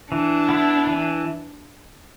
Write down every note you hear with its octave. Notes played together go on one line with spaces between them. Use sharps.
E3 D4
B3 E4
E3